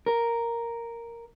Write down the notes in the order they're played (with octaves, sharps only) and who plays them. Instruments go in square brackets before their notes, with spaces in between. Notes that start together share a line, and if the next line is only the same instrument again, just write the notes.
[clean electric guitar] A#4